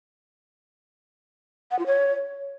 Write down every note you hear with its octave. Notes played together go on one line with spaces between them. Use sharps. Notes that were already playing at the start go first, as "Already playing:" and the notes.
F#5
F4
C#5